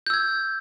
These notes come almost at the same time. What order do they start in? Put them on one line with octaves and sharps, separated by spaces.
G6 E6 G#6